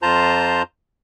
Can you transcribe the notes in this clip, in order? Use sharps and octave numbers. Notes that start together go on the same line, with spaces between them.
F2 F4 C5 A5 A#5 G6